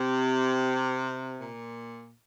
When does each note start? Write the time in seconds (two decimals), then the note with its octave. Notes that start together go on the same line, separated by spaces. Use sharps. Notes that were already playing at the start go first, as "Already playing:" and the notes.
Already playing: C3
1.40 A#2